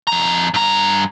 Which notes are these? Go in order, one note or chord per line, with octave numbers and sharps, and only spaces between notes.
F2 A#5
G2 A#5